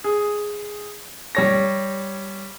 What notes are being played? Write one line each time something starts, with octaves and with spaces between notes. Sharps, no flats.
G#4
G3 C#5 A#6